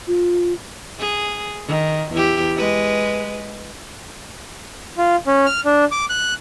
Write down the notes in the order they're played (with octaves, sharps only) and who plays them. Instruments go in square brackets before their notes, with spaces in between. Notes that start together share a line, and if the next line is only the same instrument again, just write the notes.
[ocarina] F4
[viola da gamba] G#4
D#3
E2 E4 G4
G#3 B4
[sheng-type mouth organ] F4
C#4
F6
D4
D6
F#6